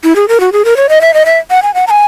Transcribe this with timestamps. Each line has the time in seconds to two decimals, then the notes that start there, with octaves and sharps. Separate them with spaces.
0.04 E4
0.16 G#4
0.28 A#4
0.40 F#4
0.53 G#4
0.65 A#4
0.77 C#5
0.89 D#5
1.01 E5
1.14 D#5
1.26 E5
1.51 F#5
1.63 G#5
1.74 F#5
1.87 A#5
1.91 G#5